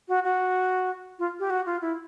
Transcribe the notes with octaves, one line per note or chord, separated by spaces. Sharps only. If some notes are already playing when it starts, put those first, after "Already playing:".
F#4
F#4
F4
G4
F#4
F4
E4